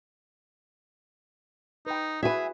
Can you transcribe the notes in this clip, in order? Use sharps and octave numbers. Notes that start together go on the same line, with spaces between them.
D#4 B4 G5
E4 F#4 G#4 B4 E5 G#5